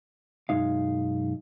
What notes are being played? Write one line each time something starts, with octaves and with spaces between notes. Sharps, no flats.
B1 F#2 G#3 D#4 F5